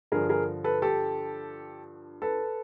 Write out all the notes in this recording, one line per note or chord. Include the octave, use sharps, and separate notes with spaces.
G2 D3 F3 G#4 A#4
G#4 A#4
A4 B4
G4 A4
A4 B4